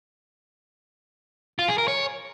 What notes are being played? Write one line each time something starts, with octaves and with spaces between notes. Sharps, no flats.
F4
G#4
A#4
C#5